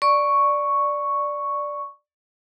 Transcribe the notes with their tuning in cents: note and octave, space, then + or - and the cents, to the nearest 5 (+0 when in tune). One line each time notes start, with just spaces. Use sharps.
D5 +0 C#6 +0